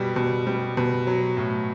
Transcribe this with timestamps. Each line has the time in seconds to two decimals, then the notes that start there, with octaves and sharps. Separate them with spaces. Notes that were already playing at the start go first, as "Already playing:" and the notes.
Already playing: B2 G3
0.16 B2
0.47 G3
0.77 B2
1.07 F#3
1.37 A2